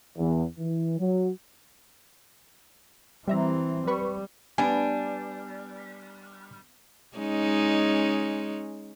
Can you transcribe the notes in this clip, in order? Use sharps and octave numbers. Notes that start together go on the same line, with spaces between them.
E2
E3
F#3
E3 G3 C4 E5 A#5
G3 B4 B5 C#6
G3 B3 D4 G#5
G#3 C#4 D#4